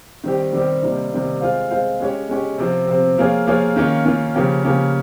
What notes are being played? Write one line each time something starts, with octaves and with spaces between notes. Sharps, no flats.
D#3 G3 C4 G4
D#3 G3 C4 G4
C3 D#3 G3 A#3
C3 D#3 G3 A#3
G#3 C4 F4 C5 F5
G#3 C4 F4 C5 F5
G#3 C#4 G4 C#5
G#3 C#4 G4 C#5
C3 F3 C4
C3 F3 C4
F3 A#3 F4 G#4 C#5
F3 A#3 F4 G#4 C#5
D#3 A#3 C#4 F4
D#3 A#3 C#4 F4
C#3 F3 A#3 C#4 G4
C#3 F3 A#3 C#4 G4